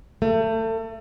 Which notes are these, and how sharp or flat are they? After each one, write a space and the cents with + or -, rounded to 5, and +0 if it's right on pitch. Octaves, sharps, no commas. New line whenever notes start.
A3 +30